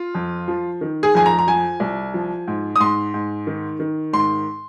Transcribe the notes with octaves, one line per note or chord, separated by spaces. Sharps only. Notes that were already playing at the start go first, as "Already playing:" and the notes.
Already playing: F4
F2
F3
D#3
G#4
F2 G#5
A#5
A#5
F3 G#5
C2
F3
G#2
D#6
G#2 C6
G#2
D#3
D#3
G#2 C6